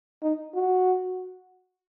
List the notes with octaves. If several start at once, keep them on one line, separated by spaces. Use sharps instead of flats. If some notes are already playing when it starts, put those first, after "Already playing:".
D#4
F#4